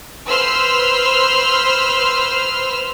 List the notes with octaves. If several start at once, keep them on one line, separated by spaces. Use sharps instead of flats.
B4 C5 C6 E6 F6